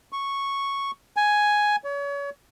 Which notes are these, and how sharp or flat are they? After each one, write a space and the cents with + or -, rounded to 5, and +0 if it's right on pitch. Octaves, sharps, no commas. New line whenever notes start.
C#6 -5
G#5 +5
C#5 +35